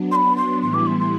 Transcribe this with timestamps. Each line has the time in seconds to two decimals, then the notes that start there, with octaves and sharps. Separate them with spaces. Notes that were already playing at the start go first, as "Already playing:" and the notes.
Already playing: F#3 B3 D4
0.11 C6
0.15 B5
0.36 C6
0.61 A2 E3 G3 B3 E4 C6
0.74 D6
0.86 C6
0.99 C6